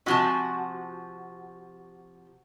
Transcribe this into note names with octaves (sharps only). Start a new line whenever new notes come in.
C3 F3 F#4 G#5 A5